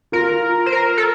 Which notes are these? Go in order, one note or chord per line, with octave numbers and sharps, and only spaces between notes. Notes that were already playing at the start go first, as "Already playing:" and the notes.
F4 A#4
C5
A#4
A4